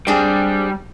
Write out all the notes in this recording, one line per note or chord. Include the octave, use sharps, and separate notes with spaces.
G3 C4 D4 G4 G#4